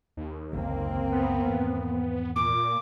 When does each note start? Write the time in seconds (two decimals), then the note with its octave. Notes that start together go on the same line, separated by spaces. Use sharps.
0.17 D#2
0.53 F#1 C#2 D3 A#3 C4
1.12 B3
1.46 E2 G#2 D#3
2.36 A#2 D6